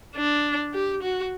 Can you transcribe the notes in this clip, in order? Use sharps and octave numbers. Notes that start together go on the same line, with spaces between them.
D4
G4
F#4